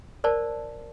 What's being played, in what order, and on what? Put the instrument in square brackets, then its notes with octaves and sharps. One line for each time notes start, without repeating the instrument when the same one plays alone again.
[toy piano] A#4 C5 D5 A5